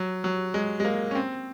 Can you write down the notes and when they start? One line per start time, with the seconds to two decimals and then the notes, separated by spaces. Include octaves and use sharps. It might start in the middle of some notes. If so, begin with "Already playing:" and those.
Already playing: F#3
0.24 F#3
0.54 G#3
0.80 G#3
0.85 A#3
1.11 C#4
1.15 C4